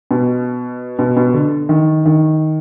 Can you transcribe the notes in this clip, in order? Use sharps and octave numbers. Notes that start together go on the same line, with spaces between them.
B2
B2
B2
D3
D#3
D#3